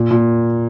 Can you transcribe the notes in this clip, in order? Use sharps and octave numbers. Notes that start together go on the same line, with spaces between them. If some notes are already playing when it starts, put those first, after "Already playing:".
Already playing: A#2
A#2